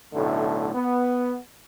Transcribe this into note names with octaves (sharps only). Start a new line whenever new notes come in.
B1 A2 D3 A3
B3